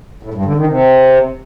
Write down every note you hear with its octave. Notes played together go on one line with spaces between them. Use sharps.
A2
G2
D3
D#3
C3